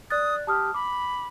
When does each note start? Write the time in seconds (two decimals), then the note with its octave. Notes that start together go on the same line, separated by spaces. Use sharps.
0.11 D5 D#6 F#6 A6
0.47 G4 A5 D#6 F6
0.74 B5 D6